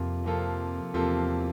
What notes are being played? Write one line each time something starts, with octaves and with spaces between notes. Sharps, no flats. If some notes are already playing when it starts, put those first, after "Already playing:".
Already playing: F2 C3 F3 A#3 F4
C3 F3 A#3 F4 A4
E2 C3 F3 A#3 F4 A4